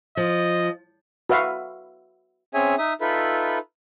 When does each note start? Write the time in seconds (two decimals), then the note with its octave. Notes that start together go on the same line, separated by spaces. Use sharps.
0.17 F3 D#5
1.29 F#4 B4 E5 F5
2.54 C4 C#4 G#4 C#5 E5 G#5
2.78 D#4 E5 D#6
3.01 D#4 F4 A4 B4 E5 B5